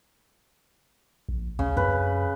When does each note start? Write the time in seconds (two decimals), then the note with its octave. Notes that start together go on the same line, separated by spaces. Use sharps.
1.29 A#1
1.59 D2 C#3
1.77 F#2 B4